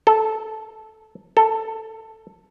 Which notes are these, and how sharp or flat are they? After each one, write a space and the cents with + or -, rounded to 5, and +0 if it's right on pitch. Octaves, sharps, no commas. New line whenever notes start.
A4 -10
A4 +10